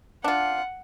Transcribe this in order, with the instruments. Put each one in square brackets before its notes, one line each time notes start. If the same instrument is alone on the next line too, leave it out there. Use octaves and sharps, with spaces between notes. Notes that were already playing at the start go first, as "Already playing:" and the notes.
[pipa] D4 F4 [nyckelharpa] F#5